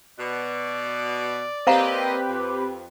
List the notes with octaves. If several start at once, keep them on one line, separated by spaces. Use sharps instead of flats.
B2 D5
A#3 C4 G4 B4 C5 D#5 F5 A#5
F2